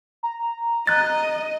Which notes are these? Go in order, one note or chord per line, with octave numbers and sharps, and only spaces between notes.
A#5
D#5 F#6 A6